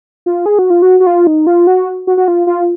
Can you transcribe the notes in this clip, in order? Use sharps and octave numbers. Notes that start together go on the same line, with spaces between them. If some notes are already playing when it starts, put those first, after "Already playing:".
F4
G#4
F#4
F4
F#4
F#4
F4
D#4
F4
F#4
F#4
F#4
F4
F4